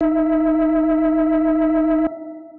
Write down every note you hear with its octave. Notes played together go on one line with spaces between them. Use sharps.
D#4 E5